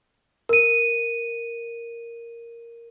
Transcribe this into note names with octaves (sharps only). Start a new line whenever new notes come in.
A#4 D#7